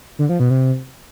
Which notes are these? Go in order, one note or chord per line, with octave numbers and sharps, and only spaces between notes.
D3
F3
B2
C3